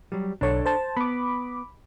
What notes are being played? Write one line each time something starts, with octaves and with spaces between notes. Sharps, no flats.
F#3 G3
B1 D4 A4 C#5
C5 A5
B3 B5 D6